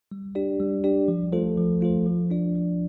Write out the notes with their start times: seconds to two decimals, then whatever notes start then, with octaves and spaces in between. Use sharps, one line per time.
0.11 G3
0.35 D4 G4 D5
0.60 G3
0.84 D4 G4 D5
1.08 F3
1.33 A3 F4 A4 C5
1.57 F3
1.81 A3 F4 A4 C5
2.06 F3
2.30 D4 F4 D5
2.55 F3